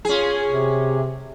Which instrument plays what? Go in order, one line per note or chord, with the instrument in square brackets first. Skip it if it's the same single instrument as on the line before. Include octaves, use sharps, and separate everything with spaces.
[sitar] C#4 G#4 [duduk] F4
[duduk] C3